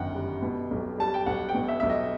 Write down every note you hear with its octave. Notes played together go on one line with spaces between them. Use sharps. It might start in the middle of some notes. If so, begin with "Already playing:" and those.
Already playing: G1 F#2 D#3 F#5 G5
G3
B2
B1
G3 A5
G5
B1 F#5
G5
B2
E5
B1 E5
D#5